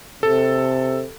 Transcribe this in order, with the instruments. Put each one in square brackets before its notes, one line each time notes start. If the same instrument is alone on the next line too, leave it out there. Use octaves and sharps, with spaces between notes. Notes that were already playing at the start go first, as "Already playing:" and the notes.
[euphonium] C3 [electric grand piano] A4